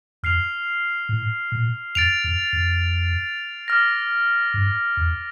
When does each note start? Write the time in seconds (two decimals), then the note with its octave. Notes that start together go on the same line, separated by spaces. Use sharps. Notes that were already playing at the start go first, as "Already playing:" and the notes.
0.23 F2 F6 C7 F7
1.09 A2
1.52 A#2
1.95 F2 A6 D7 F7
2.24 F2
2.53 F2
3.68 D6 F6 A#6
4.54 G2
4.97 E2